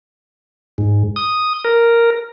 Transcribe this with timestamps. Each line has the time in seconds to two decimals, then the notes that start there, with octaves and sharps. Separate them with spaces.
0.78 G#2
1.16 D#6
1.65 A#4